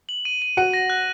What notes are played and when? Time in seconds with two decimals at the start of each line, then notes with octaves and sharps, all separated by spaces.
0.09 F#7
0.25 D#7
0.42 D#7
0.57 F#4 F#5 D#7
0.73 A#6
0.90 F#6